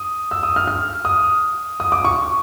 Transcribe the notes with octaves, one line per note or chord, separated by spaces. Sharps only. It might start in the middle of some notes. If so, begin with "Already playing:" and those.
Already playing: D#6
E6
D#6
F6
F6
D#6
D#6
D6
C#6